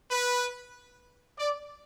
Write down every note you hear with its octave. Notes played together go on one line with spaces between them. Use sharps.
B4
D5